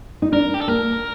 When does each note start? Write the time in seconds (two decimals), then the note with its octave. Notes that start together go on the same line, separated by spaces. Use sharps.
0.22 D#4
0.32 D4 A#4
0.54 G4
0.61 A4
0.68 A#3 A#4